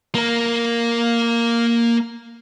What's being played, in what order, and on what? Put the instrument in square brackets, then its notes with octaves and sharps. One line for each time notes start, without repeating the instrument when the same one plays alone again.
[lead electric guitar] A#3 A#4